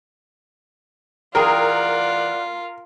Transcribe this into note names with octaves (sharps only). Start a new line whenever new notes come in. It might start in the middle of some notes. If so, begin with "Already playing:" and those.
E3 F4 G#4 A#4 D5 F#5 G5